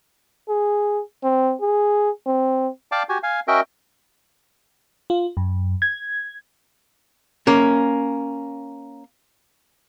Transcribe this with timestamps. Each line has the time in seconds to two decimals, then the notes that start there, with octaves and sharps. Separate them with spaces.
0.49 G#4
1.23 C4
1.61 G#4
2.26 C4
2.92 D5 F5 G5 A5 D6
3.09 F#4 G4 G#5
3.23 F5 G#5
3.48 C#4 F#4 A#4 D#5 E5 G5
5.10 F4
5.37 F#2
5.82 G#6
7.47 A#3 C#4